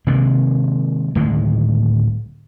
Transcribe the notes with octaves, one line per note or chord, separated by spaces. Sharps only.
C3 D#3 G#3 A#3
D1 A2 D#3 G#3